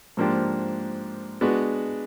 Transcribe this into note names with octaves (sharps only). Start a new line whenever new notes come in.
G#2 F3 A#3 D4 G4
G#3 B3 D4 F#4 B4